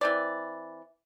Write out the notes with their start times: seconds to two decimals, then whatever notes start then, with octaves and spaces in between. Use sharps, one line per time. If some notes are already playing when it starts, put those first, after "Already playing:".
0.01 E3 C4 D5